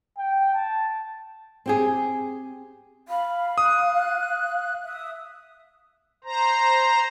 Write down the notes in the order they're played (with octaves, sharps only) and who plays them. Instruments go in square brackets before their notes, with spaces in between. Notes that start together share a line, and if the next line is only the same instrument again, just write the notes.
[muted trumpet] G5
A5
[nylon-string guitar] C4 G4 G#4
[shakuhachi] F5 [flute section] B5
[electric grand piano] D#6 [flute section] F#6
[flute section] E5 D#6
[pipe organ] C5 A#5